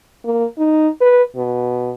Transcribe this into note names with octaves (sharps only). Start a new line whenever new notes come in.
A#3
D#4
B4
B2